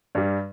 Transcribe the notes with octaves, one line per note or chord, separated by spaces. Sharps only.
G2 G3